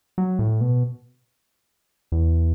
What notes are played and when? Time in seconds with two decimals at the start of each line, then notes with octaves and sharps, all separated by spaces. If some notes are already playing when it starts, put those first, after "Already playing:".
0.18 F#3
0.39 A2
0.61 B2
2.12 E2